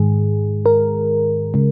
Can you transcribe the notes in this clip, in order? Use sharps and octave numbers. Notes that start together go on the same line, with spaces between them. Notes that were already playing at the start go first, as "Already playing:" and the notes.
Already playing: G#2 D#3 G#3 G#4
A#4
C#3 G#3